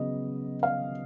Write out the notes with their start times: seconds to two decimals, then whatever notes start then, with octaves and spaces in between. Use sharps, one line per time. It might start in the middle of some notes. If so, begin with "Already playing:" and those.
Already playing: C#3 F#3 B3 D#5
0.63 F5